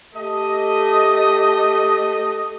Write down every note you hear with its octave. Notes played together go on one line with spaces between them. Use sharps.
A3 G4 A4 D#5